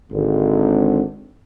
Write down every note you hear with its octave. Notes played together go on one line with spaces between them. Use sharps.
G#1 D3